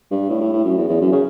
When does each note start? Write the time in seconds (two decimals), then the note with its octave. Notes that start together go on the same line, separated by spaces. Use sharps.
0.11 G2
0.29 A2
0.41 A2
0.53 A2
0.65 F#2
0.78 E2
0.89 E2
1.01 F#2
1.12 C#3